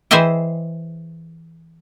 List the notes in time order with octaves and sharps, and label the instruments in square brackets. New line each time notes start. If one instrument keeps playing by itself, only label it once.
[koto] E3 G#4 C5 D#5 E5 G5